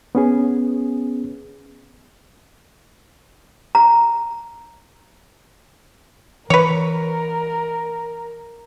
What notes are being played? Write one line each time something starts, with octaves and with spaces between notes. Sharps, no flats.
B3 C#4 G#4
A#5
E3 A#4 B4 C#5